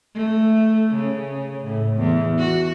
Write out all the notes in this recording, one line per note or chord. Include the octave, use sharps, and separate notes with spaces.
A3
C#3
A2
E2
F#4